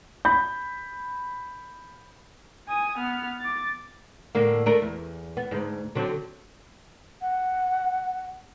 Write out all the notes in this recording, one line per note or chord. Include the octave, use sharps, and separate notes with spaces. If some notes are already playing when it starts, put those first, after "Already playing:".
B5 G6
G#5 D#6
B3 F6
D6 A6
A2 D3 A#3
A3 D4 A#4
E2
B3
D2 G#2
D3 F#3 C4
F#5